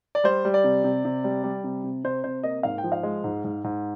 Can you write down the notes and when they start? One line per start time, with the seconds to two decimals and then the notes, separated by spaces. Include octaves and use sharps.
0.15 D5
0.24 G3 C5
0.45 G3
0.54 D5
0.64 C3
0.84 C3
1.05 C3
1.24 G3
1.44 G3
1.64 C3
1.84 C3
2.04 C3 C5
2.24 C3 C5
2.43 A#3 D#5
2.63 G#2 F5
2.78 G5
2.84 F3
2.92 F5
3.03 G#3
3.24 G#2
3.44 G#2
3.64 G#2